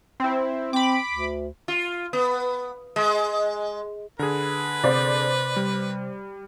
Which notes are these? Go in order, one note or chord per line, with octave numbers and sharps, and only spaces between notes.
C4 E4
C4 B5 D6
D2
F4
B3
G#3
D3 G#4 B4
C3 C5 D5
G3